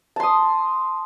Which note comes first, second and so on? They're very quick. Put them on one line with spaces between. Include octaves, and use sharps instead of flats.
A5 C6 D#6